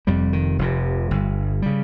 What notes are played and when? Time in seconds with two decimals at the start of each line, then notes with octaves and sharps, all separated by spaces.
0.07 F1 F2 C3 G3
0.33 D#3
0.59 F1 F2 C3
1.11 G1 G2
1.62 C#3 G3